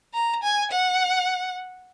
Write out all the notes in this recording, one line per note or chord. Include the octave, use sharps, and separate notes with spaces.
A#5
G#5
F#5